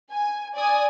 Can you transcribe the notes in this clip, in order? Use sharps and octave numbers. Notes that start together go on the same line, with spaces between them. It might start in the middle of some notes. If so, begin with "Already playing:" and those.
G#5
D5 G#5 D#6